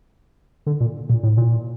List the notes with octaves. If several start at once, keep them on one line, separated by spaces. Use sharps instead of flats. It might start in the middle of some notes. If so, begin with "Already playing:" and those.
D3
A#2
A#2
A2
A#2